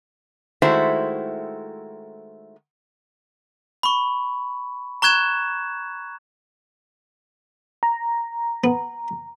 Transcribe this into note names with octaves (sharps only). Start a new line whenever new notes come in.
D#3 G#3 A3 E4 F#4 C5
B5 C#6
A#5 C#6 F#6 G#6 E7
A#5
B3